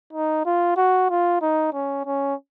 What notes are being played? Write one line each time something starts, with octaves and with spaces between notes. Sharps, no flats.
D#4
F4
F#4
F4
D#4
C#4
C#4